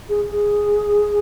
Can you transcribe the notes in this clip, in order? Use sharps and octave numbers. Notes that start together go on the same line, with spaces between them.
G#4
G#4